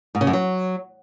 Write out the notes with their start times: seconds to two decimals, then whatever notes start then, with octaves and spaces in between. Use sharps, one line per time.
0.15 G#2
0.21 C#3
0.27 F#2
0.33 F#3